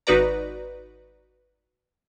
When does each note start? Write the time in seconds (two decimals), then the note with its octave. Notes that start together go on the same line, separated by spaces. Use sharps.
0.07 G#1 D#4 F#4 B4 D5 A#5